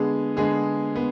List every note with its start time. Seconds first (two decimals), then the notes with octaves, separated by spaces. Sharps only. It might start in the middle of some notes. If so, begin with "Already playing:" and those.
Already playing: D3 G#3 B3 G#4
0.37 D3 G#3 B3 G#4
0.96 B3